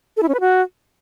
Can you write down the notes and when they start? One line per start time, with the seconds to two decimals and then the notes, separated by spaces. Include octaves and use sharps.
0.17 A4
0.23 E4
0.29 C#4
0.34 B4
0.40 F#4